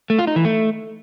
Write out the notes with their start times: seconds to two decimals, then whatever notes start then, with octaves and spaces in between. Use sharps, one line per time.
0.10 A3
0.19 F4
0.27 D#4
0.36 E3
0.45 A3